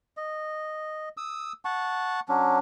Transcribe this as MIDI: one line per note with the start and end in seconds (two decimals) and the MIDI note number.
0.17 1.09 75
1.17 1.53 87
1.17 1.53 88
1.65 2.20 78
1.65 2.20 81
1.65 2.20 85
2.29 2.59 54
2.29 2.59 61
2.29 2.59 62